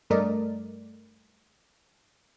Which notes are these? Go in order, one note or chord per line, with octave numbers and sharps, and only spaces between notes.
G2 A3 A#4 D5 D#5